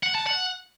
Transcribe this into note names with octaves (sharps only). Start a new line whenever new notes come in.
F#5
A5
F#5